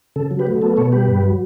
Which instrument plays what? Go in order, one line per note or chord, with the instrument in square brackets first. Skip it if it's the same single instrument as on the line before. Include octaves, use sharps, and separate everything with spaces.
[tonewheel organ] C#3 A4
F#3
G4 B4
A3
B3 A4
B2 A4 C#5
G3 G4 B4
G2
F#3